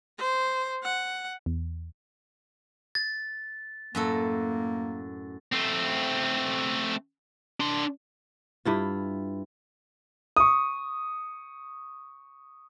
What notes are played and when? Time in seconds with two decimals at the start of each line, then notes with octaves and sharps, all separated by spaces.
0.18 C5
0.83 F#5
1.46 E2
2.95 A6
3.95 F#2 A2 A#3 A4
5.53 A3 C4
7.60 D4 C6
8.65 G2 E4 F4
10.37 C#6 D#6